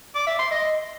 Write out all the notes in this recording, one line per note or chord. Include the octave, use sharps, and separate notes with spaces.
D6
E5
C6
D#5